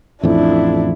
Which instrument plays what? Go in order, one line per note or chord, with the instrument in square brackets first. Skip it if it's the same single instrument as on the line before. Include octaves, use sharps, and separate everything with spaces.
[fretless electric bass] A1 F2 [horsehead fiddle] D4 E4